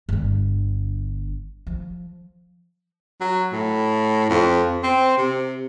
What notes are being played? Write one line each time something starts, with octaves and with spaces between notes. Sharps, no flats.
G1 D3
F3
F#3
A2
F2
C4
C3